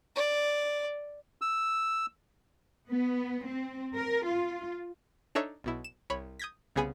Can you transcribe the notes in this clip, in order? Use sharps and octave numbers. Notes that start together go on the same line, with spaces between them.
D5
E6
B3
C4
A#4
F4
D4 D#4 A4 C#5 E5
B1 B2 E4
E7
C2 C#5 B5
D#6 G6 G#6 A#6 B6
C2 C#3 B3 G#4 G#5 B5